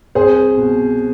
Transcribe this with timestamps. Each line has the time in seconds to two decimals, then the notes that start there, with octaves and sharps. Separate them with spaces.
0.15 C2 G#4 C5
0.57 B2